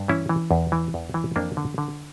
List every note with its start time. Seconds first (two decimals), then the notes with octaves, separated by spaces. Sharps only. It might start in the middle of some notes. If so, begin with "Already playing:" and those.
Already playing: G2
0.08 E3 C#4 E4
0.29 E3
0.51 E2
0.72 E3
0.94 E2
1.14 E3
1.36 F2 A#3 D4
1.57 D3
1.78 D3